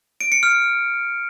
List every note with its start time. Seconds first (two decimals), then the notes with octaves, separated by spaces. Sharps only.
0.21 D7
0.32 C#7
0.43 F6